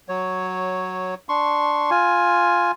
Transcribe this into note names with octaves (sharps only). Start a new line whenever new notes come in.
F#3 C#5
D4 C6 C#6
F4 G#5